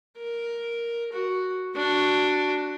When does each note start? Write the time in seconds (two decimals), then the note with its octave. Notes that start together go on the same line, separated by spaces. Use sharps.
0.17 A#4
1.13 F#4
1.75 D4 F#4